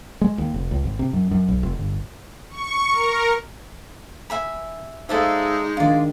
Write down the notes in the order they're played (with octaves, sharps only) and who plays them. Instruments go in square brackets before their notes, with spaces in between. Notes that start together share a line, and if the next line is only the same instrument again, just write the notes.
[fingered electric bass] G#3
D#2
F1
C#2
G#1
C3
F#2
F#2
B1
F1
G1
[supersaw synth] C#6
A#4
[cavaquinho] E5 G#5 B5
[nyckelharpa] G#3 G#4 [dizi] D#4 [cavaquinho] A4 D5 E5 [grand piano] C5 F5
[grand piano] D#3 D4 [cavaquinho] F4 D5